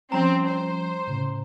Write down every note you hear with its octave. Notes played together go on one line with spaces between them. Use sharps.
F3 G3 C4 C#4 A#5
C5
A2 C#3